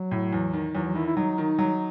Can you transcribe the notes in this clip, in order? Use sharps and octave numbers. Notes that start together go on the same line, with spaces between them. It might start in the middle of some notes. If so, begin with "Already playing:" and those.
Already playing: F#3
A2
E2
D#3
E2 F#3
F#3
D#3 E4
E4
F#3 D#4
D#3
F#3